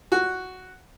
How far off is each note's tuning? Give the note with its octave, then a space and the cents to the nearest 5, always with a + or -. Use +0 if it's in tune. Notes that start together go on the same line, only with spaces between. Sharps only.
F#4 +0 F#5 +0